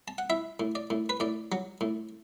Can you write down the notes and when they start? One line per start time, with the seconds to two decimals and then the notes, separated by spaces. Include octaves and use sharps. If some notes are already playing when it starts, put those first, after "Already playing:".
0.08 A5
0.18 F#5
0.30 E4 E5
0.60 A2
0.75 D5
0.90 A2
1.09 B4
1.20 A2 D5
1.52 F#3
1.81 A2